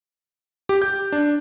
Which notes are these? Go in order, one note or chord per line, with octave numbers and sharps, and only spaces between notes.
G4
G6
D4